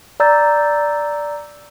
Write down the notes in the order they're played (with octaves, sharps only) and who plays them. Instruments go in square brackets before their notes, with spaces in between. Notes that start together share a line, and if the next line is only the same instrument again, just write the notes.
[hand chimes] D5 A#5 E6 G6 A6